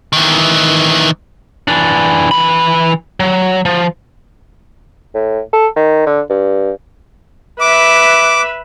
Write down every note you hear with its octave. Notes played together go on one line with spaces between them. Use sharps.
D#3 E3
E3 D4
E3 B5
F#3
F3
A2
A4
D#3
D3
G2
B4 E5 D6